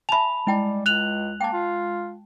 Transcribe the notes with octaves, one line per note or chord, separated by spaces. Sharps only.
E5 G#5 A5 B5 F7
G3 G#3 E4 G5 A5
C#2 F#6 F7 F#7
A#3 G5 A5
F4